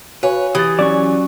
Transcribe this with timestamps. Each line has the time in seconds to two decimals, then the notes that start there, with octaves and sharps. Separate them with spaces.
0.23 F#4 B4 C#5 F5 G#5
0.55 E3 G4 D#6 A6
0.79 F#3 C#4 D5 C#6